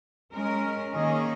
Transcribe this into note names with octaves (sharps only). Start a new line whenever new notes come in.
G#3 C#4 A#4
D#3 A#3 C#4 G#4 D#5